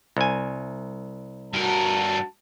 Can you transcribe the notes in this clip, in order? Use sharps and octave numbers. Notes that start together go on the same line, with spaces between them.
C2 G#5
G2 F#4 A#4 A5